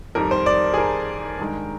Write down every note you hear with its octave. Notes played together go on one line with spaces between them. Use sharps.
F2 D#3 G3 A#4
C5
D5
G#4
A#4
G2 D#3 G#3